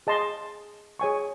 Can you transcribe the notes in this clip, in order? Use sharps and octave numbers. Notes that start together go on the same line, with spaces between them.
G#4 D#5 A5 C6
G#4 C#5 G#5 C#6